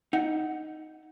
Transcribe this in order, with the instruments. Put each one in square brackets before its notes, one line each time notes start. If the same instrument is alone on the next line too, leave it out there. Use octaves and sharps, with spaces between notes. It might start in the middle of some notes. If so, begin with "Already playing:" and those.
[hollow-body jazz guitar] D#4 F#5